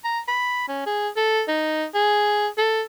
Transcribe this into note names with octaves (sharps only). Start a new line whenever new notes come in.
A#5
B5
C#4
G#4
A4
D#4
G#4
A4